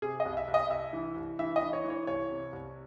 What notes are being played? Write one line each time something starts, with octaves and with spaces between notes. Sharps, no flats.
C3 G#4
D#5
C2
E5
C2
D#5
C2 E5
E3
C2
E3 E5
D#5
E3
C#5
E3
C#5
C2 C#5
C3
C2